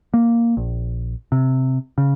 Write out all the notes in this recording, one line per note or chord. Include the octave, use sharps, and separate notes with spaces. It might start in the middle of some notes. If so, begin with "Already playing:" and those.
A#3
A#1
C3
C#3